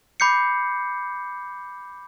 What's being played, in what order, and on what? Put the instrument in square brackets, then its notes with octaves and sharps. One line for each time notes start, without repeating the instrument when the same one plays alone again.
[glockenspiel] B5 D6 G6 C7 C#7